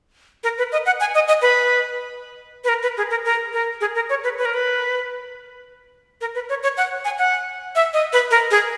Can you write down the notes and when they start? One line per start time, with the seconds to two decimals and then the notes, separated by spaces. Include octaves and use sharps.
0.44 A#4
0.58 B4
0.72 D#5
0.86 F#5
1.00 G#5
1.15 D#5
1.28 D#5
1.42 B4
2.64 B4
2.69 A#4
2.83 B4
2.97 G#4
3.11 A#4
3.25 A#4
3.53 A#4
3.81 G#4
3.95 A#4
4.10 C#5
4.24 B4
4.38 B4
4.45 A#4
4.54 B4
6.21 A#4
6.35 B4
6.49 C#5
6.63 C#5
6.77 F#5
7.05 G#5
7.18 F#5
7.75 E5
7.93 D#5
8.13 B4
8.31 A#4
8.51 G#4